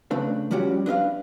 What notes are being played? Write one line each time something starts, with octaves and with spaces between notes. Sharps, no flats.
C#3 A3 D4 B4
F3 G3 C#4 F#4 G4
D4 B4 D#5 F5